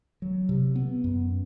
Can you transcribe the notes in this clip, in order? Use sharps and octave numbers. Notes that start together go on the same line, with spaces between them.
F#3
C3
B3
F#2